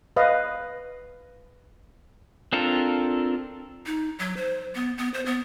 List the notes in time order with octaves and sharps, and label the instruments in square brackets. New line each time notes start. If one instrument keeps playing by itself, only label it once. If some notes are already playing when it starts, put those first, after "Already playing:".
[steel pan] B4 D#5 F5
[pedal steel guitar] C4 D4 F4 A4 A#4
[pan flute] D#4
F#3
C5
B3
B3
C5
B3